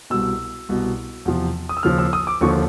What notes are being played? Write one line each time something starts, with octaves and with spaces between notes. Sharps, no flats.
C2 B2 E6
C2 B2
E2 C3 F3
D#6
E6
D#2 C#3 F3 F6
E6
D#6
D6
D#2 D3 F3 C#6